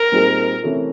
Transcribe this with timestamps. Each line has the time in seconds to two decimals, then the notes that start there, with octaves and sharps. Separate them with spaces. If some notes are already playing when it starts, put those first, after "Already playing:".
Already playing: A#4
0.12 A#2 G3 C4 D#4 G#4
0.63 C3 E3 A3 C#4